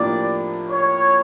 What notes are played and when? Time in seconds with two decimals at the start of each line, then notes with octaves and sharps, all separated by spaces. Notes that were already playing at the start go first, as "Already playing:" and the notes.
Already playing: A2 F3 A#3 D4 G4 D5
0.69 C#5